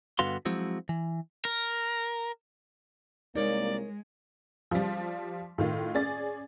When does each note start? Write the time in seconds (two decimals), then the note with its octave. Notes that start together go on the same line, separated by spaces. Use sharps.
0.19 G2 D3 B3 F#4 F5 C6
0.45 F3 F#3 G#3 C4 E4 F#4
0.89 E3
1.45 A#4
3.35 C2 G#3 A#3 D#4 A#4 C#5 D5
4.71 F3 G3
5.58 A2 D#3 F4
5.94 C#4 G#4 D5 A6